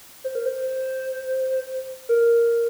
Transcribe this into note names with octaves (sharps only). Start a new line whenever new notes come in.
C5
A#4
C5
A#4